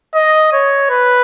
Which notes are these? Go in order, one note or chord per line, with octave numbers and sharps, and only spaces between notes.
D#5
C#5
B4